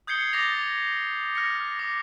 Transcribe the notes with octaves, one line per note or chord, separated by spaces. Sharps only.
D#6 G6 G#6 C7 C#7 G7
D6 A6 A#6 F7
F6 A#6 C#7
D6